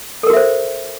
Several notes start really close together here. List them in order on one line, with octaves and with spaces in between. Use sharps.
A4 A#4 F#4 E5 C5